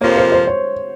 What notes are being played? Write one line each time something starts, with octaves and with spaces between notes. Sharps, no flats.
F2 C3 F3 A#3 C#5
C5
C5
C#5